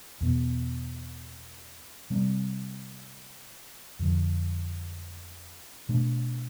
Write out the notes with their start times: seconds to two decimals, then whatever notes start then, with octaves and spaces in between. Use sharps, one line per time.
0.21 E2 B2 B3
2.10 C3 G3 C4
3.99 F2 D3 F3
5.89 B2 A3 D4